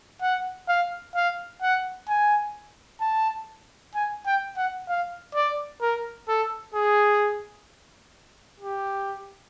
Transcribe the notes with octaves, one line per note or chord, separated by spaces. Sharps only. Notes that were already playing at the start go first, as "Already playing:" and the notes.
F#5
F5
F5
F#5
G#5
A5
G#5
G5
F#5
F5
D5
A#4
A4
G#4
G4